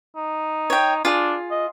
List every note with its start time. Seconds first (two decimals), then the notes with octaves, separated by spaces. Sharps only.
0.16 D#4
0.70 C#5 G5
1.05 D4 F4 G#4
1.51 D#5